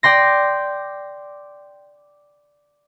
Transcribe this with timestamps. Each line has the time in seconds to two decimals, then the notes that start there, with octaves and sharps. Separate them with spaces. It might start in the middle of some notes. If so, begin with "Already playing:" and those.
0.03 D5 G5 C6 A#6